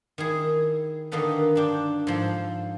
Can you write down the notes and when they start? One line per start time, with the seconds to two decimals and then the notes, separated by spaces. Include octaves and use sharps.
0.18 D#3 E4 G#4
1.12 D3 D#3 A#3 D#4 A4 B4
1.55 G2 D4 G5
2.07 G#2 F3 A4